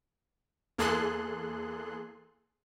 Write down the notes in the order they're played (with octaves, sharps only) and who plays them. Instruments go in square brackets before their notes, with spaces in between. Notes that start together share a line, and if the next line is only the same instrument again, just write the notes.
[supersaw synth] E2 A#3 G#4 A4 C6 F#6